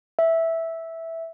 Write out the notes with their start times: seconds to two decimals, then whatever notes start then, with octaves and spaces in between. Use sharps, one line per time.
0.19 E5